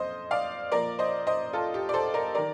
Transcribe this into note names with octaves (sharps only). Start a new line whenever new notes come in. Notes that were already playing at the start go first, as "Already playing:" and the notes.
Already playing: F2 C5 D#5
D5 F5
A#2 F3 A#4 D5
C5 D#5
C5 D#5
F4 A4
G4
D5
A4 C5
A#4 D5
D#3 A#4 D5